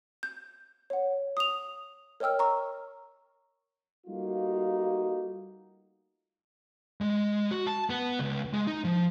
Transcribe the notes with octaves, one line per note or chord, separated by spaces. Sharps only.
G6
C#5 F#5
D#6 F7
A#4 C#5 D#5 G5 E6 F6
A#5 C#6
G3 A3 A#3 D#4 F4 F#4
G#3
F#4
A5
B3
C#2
G#3
D#4
F3